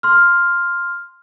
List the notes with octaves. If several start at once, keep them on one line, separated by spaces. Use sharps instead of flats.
C6 F6